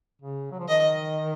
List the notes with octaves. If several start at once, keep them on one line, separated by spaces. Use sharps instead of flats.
C#3
F#3
F3
D#3 D#5